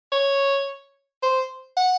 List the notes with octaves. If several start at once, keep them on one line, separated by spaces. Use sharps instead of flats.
C#5
C5
F#5